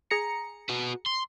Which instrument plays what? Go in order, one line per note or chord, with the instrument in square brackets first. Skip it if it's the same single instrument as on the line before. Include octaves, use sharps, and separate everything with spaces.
[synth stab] G#4 A#5 C#7
[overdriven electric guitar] F#4 B4
C6